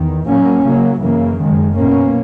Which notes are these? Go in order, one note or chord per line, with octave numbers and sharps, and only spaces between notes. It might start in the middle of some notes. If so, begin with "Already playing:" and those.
Already playing: E2 D#3
A#2 F#3 A#3 C#4
C#3 F#3 A#3
F#2 C#3 E3 A#3
F#2 D#3 G#3
B2 A#3 C#4